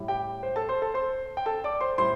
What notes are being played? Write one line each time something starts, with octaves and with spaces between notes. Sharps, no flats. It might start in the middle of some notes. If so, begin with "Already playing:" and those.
Already playing: A2 G3 E4
G4 G5
C5
A4 A5
C5 C6
A4 A5
C5 C6
G5
A4 A5
D5 D6
C5 C6
A2 G3 E4 C5 C6